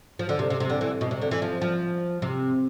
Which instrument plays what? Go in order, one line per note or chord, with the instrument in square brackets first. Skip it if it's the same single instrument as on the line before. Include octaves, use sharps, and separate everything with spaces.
[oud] F3
D3
C3
C3
C3
D3
E3
B2
C3
D3
E3
F3
F3
C3